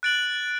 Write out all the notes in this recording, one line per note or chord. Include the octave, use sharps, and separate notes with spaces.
F#6 A6 D7 F#7